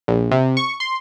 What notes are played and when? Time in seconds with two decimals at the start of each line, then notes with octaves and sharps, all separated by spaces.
0.08 A#1
0.31 C3
0.57 C#6
0.80 C6